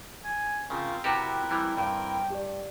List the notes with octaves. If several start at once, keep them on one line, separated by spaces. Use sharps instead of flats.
G#5
C#3 C4 F4 A#4
C3 C4 E4 F#4 G4 A#4 B4 A6
E3 G3
G2 G5
G4 D5